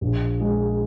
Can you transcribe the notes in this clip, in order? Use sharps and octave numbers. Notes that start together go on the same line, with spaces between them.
A#1
G#3